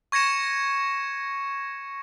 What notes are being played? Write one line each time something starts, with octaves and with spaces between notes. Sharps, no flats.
C#6 G#6 A#6 C#7 E7